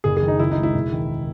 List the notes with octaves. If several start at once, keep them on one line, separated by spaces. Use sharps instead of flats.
F#1 G#4
G#4
D#3
D#4
C#2 E4
D#4
G#3
E4
E1
D#3